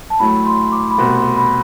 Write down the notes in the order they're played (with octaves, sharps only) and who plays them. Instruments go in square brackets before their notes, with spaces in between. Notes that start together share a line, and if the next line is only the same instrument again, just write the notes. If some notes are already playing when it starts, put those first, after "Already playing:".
[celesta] A5
[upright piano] A2 F#3 A3 [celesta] B5
[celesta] C6
D6
B5
[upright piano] C2 B2 A3 C4 F#4 [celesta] C6
[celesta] C6
B5